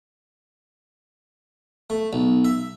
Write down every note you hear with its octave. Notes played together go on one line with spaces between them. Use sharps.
A3
B1
E5